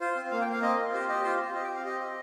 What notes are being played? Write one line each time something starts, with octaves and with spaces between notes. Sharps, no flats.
F4 C5
C4
A#3 F5
G5
A#3 F5
C4 D#5
F4
G4 C5
G4 D#5
F4 C5
C4
G4 D#5
G5
C4
F5
G4 D#5
G4